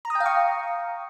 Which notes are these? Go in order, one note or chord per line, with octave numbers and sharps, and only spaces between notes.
A#5
D#6
G5
F5
C#6